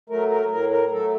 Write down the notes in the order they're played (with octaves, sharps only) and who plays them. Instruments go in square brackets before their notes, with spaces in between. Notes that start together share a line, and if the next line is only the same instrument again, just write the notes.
[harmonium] F#3 A3 A#4
A#4
A2 A#4
A#4
F#3 A3 A4